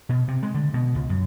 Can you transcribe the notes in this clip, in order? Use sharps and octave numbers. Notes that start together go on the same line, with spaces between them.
B2
C3
G#3
D3
B2
C#2
F#2